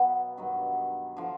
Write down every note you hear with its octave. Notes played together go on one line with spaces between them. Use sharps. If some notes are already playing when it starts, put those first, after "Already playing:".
Already playing: B2 F#3 B3
G2 D#3 F#3
D3 F3